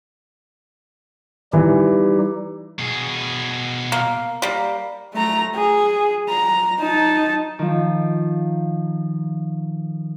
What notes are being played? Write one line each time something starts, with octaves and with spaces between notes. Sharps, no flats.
E3 G3 D#4 G4
B2 G#4
A#3
G3 A#3
A3 A#5
G#4
A#5
D#4 A5
D#3 F3